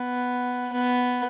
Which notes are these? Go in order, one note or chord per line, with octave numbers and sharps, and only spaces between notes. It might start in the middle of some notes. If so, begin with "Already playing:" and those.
Already playing: B3
B3